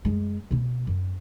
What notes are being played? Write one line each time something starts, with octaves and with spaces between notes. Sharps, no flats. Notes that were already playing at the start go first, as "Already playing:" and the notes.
F#2 G#3
B2 C4
F#2